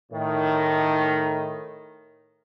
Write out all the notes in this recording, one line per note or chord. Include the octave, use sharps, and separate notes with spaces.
A2 D#3